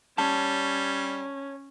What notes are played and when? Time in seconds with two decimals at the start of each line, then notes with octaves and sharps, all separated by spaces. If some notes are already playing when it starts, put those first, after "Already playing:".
0.18 G3 C#4 C#5 A5